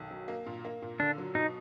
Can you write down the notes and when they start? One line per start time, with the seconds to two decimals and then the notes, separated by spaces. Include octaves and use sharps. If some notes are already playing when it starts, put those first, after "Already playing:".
Already playing: B1 D#3
0.11 F#3
0.28 A#3
0.47 A#2
0.65 A#3
0.82 A#2
0.99 D3 D4
1.18 F#3
1.35 B2 D#4